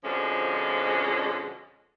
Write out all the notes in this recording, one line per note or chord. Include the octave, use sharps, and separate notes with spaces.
F2 B2 D3 F3 G#3 C#4